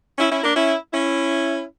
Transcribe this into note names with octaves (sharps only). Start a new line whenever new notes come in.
C#4 E4
C#4 E4
A#3 D4
C#4 E4
C#4 E4